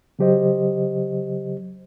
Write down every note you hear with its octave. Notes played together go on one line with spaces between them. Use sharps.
C#3 F#3 G4 C5 D#5